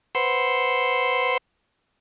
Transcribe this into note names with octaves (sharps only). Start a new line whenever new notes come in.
B4 C5 F#5 C6 E6